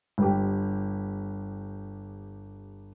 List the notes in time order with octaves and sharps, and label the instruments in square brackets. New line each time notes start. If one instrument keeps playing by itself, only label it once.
[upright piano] G1 G4